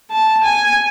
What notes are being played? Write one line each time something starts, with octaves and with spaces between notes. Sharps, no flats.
A5
G#5